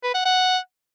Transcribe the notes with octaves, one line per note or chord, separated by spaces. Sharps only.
B4
F#5
F#5